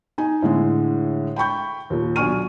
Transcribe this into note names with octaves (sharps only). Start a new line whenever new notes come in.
D#4 G#5
A2 D3 G#3
G5 B5 C#6 G6
D#2 A#2
B1 D4 G#5 C#6 F6 D#7